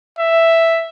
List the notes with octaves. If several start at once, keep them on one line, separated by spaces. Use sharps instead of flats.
E5